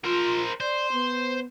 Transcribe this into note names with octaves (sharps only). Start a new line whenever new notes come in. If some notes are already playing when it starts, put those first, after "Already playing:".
F4 A#4 C5
C5 D5
B3